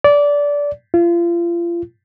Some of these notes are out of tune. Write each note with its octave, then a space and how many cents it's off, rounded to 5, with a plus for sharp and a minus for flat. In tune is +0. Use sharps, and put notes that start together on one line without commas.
D5 -20
F4 -35